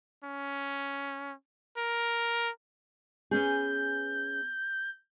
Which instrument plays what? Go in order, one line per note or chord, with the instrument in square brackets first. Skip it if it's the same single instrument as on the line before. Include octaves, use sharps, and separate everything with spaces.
[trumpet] C#4
A#4
[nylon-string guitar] B3 C#4 G#4 [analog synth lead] G6